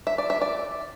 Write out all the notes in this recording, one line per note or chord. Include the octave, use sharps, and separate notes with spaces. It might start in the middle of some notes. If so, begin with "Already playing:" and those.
E5
D5
E5
D5